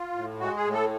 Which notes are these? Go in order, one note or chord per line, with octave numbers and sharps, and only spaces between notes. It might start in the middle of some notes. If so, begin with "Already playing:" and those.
Already playing: F4
A2
G#3 F#4
G#4
A2
A4